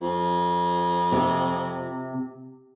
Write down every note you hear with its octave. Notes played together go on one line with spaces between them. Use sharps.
F2
C3